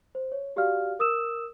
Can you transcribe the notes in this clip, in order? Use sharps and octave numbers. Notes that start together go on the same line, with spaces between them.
C5
C#5
F#4 G4 D5 F5 F6
A#4 D#6 E6 E7